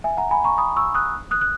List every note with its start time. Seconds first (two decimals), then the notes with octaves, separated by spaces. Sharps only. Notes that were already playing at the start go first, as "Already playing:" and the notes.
0.04 E5 G#5
0.17 F#5 A#5
0.31 G#5 B5
0.44 A#5 C#6
0.58 B5 D#6
0.76 C#6 E6
0.95 D#6 F#6
1.31 D#6 F#6
1.41 F#6